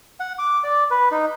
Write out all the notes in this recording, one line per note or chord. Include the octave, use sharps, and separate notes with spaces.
F#5
D6
D5
B4
D#4